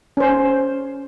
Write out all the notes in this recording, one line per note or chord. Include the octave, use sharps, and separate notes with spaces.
C#4 C5